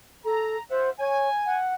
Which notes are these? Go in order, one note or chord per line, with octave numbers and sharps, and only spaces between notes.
A4 A#5
F4 C5 E5 F#5
C#5 G#5
F#5